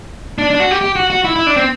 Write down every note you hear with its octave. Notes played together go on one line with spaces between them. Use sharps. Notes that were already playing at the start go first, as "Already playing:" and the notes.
D4
D4
F#4
G4
G4
F#4
F#4
E4
E4
D4
C4